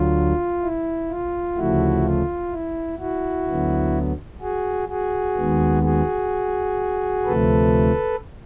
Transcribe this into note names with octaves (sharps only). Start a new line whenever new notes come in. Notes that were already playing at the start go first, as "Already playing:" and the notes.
Already playing: D2 D3 F#3 F4
E4
F4
D2 C#3 F3 A3 E4 F#4
F4
E4
E4 F#4
D2 D3 F#3 B3
F#4 G#4
F#4 G#4
D#2 D#3 G#3 B3
F#4 G#4
D2 C3 F3 A3 A4 B4